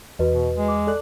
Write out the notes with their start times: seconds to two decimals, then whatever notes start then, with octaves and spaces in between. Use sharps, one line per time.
0.19 E2 F#4 B4 D#5
0.32 B2
0.56 G#3
0.68 D6
0.87 A4 D5 F#6